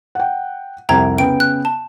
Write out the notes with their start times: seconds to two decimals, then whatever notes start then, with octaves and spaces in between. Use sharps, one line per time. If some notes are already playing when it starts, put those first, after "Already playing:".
0.15 F#5 G5
0.89 C2 F2 C3 G5 A#5 G#6
1.18 C#3 B3 G5 D7
1.40 F#6
1.65 A5